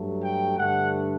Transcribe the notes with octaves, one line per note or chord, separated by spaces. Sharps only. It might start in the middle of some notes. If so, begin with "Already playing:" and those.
Already playing: G2 F#3 A3
G5
G2 D3 A3 D4 F#5